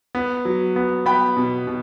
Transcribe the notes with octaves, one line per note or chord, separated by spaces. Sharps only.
B3
F#3
B3
B3 G5 B5
B2
B2